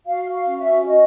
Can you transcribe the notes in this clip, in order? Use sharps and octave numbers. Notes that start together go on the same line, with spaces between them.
F#4 F5
F5
C#4
E5
F#4 D#5